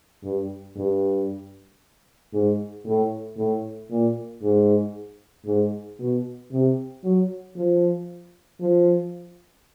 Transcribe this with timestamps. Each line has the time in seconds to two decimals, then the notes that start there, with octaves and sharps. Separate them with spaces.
0.23 G2
0.76 G2
2.33 G#2
2.86 A2
3.37 A2
3.90 A#2
4.43 G#2
5.46 G#2
5.99 B2
6.52 C3
7.04 F#3
7.56 F3
8.60 F3